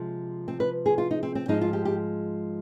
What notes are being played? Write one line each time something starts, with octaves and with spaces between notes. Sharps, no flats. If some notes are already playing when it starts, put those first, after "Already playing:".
Already playing: C3 F3 G#3
C4
B4
G#4
F4
D#4
C4
C4
G#2 F3 G#3 D#4
F4
G4
G4